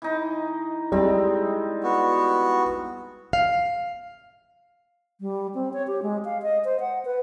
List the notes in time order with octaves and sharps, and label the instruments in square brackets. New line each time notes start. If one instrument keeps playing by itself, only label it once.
[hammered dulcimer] E3 D#4
[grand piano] G3 [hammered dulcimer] G#3 C4
[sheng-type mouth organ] B3 F#4
[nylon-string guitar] F5
[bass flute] G3
C4
C#5
G4
G#3
F5
D#5
C5
F#5
B4